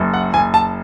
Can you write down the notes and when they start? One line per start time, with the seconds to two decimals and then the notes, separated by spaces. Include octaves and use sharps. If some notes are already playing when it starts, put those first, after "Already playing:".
Already playing: F#1 F#2
0.14 F#5
0.33 F#1 G#5
0.54 A5